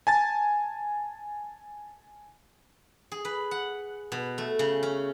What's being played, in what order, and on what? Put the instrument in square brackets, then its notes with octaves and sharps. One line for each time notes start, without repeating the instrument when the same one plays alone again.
[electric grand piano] G#5 A5 A6
[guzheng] G#4
B4
F#5
B2
A3
C#3
C#4